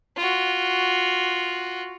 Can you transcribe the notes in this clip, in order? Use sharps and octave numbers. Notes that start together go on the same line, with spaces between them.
F4 F#4